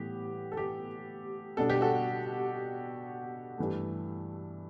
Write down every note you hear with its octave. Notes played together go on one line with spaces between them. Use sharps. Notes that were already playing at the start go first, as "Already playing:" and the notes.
Already playing: A2 E3 G3 B3 G4
A4
G4
B2 G3 D4 A4
G4
F#4 A4
G2 E3 A3